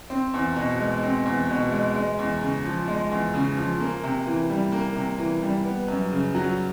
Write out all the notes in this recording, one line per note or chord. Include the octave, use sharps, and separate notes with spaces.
C4
E2
B2
G#3
C4
E2
B2
G#3
G#3
E2
C#3
F3
G#3
E2
C#3
F3
A#3
C3
E3
G3
A#3
C3
E3
G3
B3
F#2
C#3
F#3